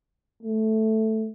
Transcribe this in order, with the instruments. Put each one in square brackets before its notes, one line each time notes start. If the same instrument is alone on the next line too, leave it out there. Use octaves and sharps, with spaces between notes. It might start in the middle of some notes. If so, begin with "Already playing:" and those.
[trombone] A3